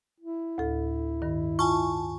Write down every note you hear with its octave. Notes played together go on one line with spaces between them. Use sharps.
E4
D2 A2 A4
G2 D#3
F4 G#5 A5 C#6